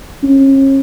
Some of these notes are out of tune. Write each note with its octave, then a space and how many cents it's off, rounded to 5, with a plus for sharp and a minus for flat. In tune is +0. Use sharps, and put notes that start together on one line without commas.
C#4 -35